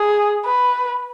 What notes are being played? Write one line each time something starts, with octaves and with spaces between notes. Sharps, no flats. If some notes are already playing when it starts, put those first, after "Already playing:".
Already playing: G#4
B4